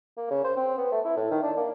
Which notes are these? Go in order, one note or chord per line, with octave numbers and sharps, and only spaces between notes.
A#3
C#3
C5
C4
B3
A3
E4
A2
D#3
D4
A#3